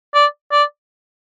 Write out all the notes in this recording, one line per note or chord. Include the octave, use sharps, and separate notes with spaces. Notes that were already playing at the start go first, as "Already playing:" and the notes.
D5
D5